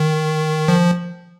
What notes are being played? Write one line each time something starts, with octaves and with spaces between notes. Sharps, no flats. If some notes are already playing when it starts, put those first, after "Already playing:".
Already playing: D#3
F3